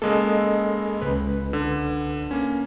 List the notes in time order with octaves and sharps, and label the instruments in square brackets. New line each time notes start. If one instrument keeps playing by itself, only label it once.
[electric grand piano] C#3 G#3 A#3 [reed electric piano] A4 D#5 E6
[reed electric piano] C#2 B4
[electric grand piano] D3
A#3 C#4